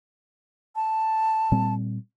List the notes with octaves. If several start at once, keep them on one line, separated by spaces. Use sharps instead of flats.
A5
A#2 G3 C4